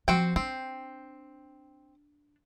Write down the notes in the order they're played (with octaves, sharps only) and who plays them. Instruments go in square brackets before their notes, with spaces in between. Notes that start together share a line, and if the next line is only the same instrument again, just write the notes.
[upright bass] F3 [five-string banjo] C4 F#4 G5
[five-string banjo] C4 [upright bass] D4